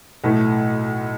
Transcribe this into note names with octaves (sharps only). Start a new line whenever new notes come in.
B1 A2 E3 A3